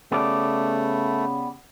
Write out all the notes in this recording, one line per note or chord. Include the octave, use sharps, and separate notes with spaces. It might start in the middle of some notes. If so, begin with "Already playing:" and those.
C#3 A3 B3 G4 D5